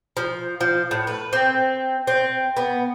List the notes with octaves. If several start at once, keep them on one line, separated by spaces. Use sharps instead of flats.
F3
F3
A2
B4
C4
C4
B3